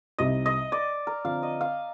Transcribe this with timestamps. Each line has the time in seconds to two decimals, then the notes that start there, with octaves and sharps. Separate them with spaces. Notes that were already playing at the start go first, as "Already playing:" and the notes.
0.18 C2 C3 G3 C4 D#4 D#5
0.46 D#5
0.72 D5
1.07 A#4
1.24 D3 F3 C4 F5
1.43 D#5
1.61 F5